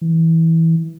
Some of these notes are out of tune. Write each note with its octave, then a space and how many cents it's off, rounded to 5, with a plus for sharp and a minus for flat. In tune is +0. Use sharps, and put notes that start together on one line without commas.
E3 -15